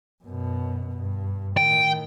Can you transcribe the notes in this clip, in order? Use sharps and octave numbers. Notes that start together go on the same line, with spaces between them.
F#2 B2
G2
A2 D#3 G5